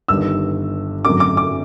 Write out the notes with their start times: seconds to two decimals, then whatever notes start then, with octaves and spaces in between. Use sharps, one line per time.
0.08 G1 G2 D#3 G3 E6
1.05 G#1 F#2 D3 F#3 A3 D6
1.20 D6
1.37 D6